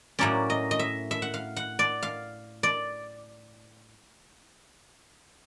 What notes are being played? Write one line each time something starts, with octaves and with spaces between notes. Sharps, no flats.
A2 F#3 A#3 C#4 D5
D#5
D#5
E5
E5
F#5
F5
F#5
D5
F5
D5